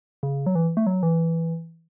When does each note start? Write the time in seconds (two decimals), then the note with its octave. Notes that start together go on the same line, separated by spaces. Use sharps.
0.23 C#3
0.46 F#3
0.55 E3
0.77 A3
0.87 F#3
1.03 E3